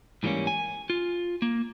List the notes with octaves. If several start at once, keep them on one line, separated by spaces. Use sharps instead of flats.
G#2 E3 G3 A#3 C#4
G#5
F4
A#3